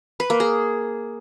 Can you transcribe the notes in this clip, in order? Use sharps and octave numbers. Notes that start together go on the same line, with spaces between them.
B4
A#3
G#4